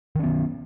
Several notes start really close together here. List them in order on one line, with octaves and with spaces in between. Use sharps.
D#3 C#4 B3